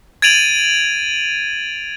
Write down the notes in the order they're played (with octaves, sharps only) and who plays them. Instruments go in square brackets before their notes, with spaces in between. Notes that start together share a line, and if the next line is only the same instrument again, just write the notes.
[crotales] G#6 A6 D7 D#7 F7 F#7